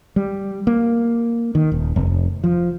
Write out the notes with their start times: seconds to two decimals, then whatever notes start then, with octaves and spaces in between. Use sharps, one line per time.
0.16 G3
0.67 A#3
1.55 D#3
1.72 D#1
1.96 F1
2.44 F3